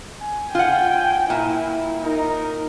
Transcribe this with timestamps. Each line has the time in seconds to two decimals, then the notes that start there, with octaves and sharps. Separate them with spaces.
0.22 G#5
0.55 F4 F#5 G5
1.30 A#2 E4
2.02 D#4 A#4